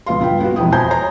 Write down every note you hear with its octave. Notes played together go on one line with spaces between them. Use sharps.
C#2 B3 F5 C6
G2 F4 B4 G5
B3 F#4
E1 F2 E4 G5 D#6
C5 G#5 A#5 B5 G6
C#5 A#5